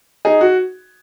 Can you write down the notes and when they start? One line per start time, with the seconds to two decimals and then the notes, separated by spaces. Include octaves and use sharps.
0.25 D#4 G#4
0.41 F#4